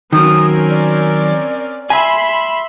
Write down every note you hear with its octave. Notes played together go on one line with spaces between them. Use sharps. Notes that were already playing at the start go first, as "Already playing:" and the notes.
D#3 F#3 C4 C#4 A#4 D#6
D5
E5 G#5 B5 C6